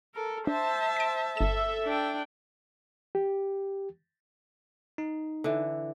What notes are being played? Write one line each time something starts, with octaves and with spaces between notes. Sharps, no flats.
A4 A#4
D4 C5 E5 A5
B6 D7
G1 A4 E5 E7
D4 G5
G4
D#4
D3 E3